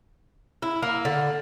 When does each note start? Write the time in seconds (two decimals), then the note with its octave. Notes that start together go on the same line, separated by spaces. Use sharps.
0.62 E4
0.82 A#3
1.05 D3